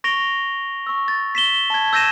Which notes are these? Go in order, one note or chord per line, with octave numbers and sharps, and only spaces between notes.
C#6 A#6 D7 F7 G7
C#6 E6
A6
B6 E7 G7
A5 G#6
E6 G6 G#6 A#6 D#7 E7